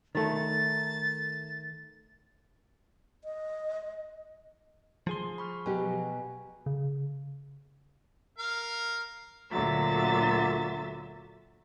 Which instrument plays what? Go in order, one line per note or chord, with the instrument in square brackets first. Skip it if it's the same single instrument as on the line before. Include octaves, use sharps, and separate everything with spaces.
[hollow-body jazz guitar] D#3 A3 [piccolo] A6
[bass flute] D#5
[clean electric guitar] F3 G#4 C6
[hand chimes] B5 C#6 F6
[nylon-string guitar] B2 F#3 G4 [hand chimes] G#5
[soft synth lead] C#3
[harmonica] A#4 F5
[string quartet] D2 A#2 D3 F#3 E5 A6